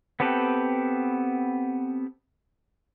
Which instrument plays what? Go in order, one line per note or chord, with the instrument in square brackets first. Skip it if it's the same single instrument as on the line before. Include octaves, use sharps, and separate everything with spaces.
[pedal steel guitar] B3 C4 G4 A4 B4